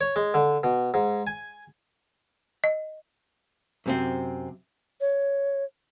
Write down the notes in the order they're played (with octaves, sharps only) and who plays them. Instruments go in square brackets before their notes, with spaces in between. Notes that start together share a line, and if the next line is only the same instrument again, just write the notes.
[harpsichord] C#5
G#3
D3
B2
G#2
G#5
[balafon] D#5
[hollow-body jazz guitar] F#2 C3 C4
[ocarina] C#5